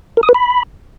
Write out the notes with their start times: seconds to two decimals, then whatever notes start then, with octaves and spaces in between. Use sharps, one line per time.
0.17 A#4
0.23 D#6
0.29 B4
0.34 B5